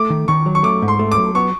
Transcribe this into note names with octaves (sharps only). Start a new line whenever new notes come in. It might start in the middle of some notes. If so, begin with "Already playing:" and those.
Already playing: A3 D6
D#3
D#3 C#6
F#3
C#6
A3 D6
G#2
C6
A3
D6
F#3
B3 C#6